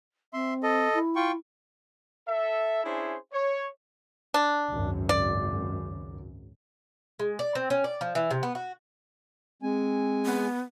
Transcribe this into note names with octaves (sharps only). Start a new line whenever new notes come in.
C4 E5 C6
A4 D#5
E4
F4 G5 C#6
A4 E5
C#4 D4 E4 G#4 C5
C#5
D4
G#1 C#2 F#2
D5
G#3
D5
C4
C#4
D5
F3
E3
C3
B3
F#4
G#3 C4 G#5
B3